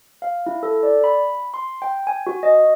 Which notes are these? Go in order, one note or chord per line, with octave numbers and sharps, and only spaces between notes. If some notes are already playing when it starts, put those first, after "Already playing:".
F5
E4
A4
D5
B5
C6
G5
G#5
F#4
D#5